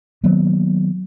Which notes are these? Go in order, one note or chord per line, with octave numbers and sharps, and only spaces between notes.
D#3 F#3 A#3 B3